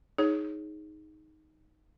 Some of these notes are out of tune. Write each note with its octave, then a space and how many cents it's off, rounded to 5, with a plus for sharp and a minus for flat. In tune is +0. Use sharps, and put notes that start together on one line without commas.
D#4 +5 G#4 +0 C#5 +0